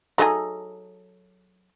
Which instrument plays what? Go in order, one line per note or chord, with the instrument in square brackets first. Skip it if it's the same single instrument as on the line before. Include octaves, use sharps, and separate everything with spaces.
[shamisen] F#3 D#4 G#4 [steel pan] A4 A#5